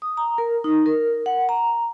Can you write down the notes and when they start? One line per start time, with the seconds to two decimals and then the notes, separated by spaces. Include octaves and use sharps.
0.02 D#6
0.17 A#5
0.38 A#4
0.64 D#4
0.86 A#4
1.26 F#5
1.49 A#5